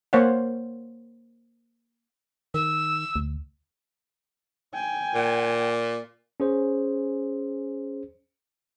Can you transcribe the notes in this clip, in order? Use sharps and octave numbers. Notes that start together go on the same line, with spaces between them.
A#3 C5 C#5 F5 F#5
D#3 E6
D2
G5 G#5
A#2
C#4 G#4 C5